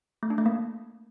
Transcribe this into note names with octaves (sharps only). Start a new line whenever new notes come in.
A3
D4
A3
A#3